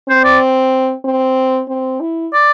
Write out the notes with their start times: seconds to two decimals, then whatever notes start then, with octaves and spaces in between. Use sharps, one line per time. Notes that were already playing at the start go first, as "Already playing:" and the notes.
0.09 C4 C5
0.24 D5
1.05 C4
1.69 C4
2.00 E4
2.33 D5